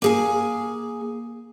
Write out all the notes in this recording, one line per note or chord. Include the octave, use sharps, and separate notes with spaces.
A#3 G#4 G#5